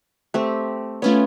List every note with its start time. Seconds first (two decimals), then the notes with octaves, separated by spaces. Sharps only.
0.34 A3 C4 G4
1.02 A3 B3 C#4 F4 C#5